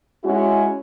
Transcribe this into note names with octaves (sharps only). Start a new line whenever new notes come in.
G#3 C#4 E4 F#4